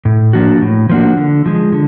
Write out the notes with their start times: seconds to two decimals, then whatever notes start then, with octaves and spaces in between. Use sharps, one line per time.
0.05 A2
0.33 F3 A#3 D4 F#4
0.62 A2
0.89 F3 A#3 D4 F#4
1.17 D3
1.46 F3 G#3
1.72 D3